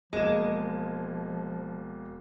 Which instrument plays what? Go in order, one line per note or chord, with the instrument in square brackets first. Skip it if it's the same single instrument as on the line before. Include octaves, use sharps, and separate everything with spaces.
[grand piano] E1 A#3 E7 [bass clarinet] F3 [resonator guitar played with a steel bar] G#3